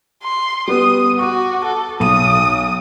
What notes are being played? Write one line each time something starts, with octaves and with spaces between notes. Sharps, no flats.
C6
G3 B3 B4 D#6
F#4 C#6 D6
A4
B1 D#6 D#7